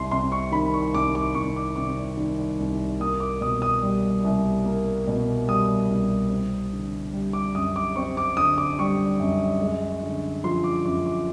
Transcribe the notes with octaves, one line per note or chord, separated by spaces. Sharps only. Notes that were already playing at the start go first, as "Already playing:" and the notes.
Already playing: C2 C6
C3 C6
C#6
D#3 B5
C#6
C2 D6
D6
C2 C#6
D6
C3 D6
D#3
C2
A#3 D#6
D6
B2 D#6
D#6
G3
C2
A#3
B2
G3 D#6
C2
C4
D3
G3
D6
F#2 D#6
D6
C4 C#6
D6
D3 D#6
D6
G3 C#6
F#2
G#3
D3
F3 C6
D6
F#2 D6
D6